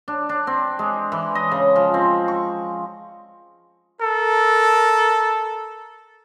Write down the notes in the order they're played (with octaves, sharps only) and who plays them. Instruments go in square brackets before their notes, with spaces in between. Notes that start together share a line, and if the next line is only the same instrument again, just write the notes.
[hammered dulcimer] D4
D4
C4
G#3
E3
D#5
C#3
F3
C4
C#6
[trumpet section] A4 A#4